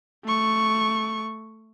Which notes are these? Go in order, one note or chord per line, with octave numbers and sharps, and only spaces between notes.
A3 C#6